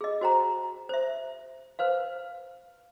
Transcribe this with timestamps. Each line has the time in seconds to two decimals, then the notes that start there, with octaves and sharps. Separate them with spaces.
0.01 G#4 D#5
0.21 F#4 C5 G5 A#5
0.89 C5 E5
1.79 B4 C5 F5